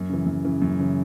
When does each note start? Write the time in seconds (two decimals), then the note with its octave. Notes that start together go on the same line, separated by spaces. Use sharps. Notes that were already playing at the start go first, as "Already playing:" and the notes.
Already playing: F#2
0.10 C#3 E3
0.27 F#2
0.45 C#3 E3
0.62 F#2
0.79 C#3 E3